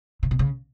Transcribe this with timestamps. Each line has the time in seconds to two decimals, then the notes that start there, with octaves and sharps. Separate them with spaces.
0.23 C#3
0.31 B2
0.39 C#3